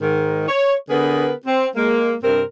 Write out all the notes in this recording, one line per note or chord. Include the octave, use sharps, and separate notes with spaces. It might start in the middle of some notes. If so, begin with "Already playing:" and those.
G#2 D#3
C#5
D3 B3 G#4 A#4 B4
C4
G#3 A#3
G2 C3 C4 A#4